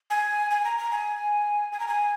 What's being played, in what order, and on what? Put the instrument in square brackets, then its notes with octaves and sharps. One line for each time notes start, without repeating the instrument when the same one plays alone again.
[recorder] G#5
G#5
A#5
A#5
G#5
G#5
A#5
G#5